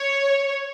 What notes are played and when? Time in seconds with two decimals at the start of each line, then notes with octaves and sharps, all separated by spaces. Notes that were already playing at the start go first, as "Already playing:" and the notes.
Already playing: C#5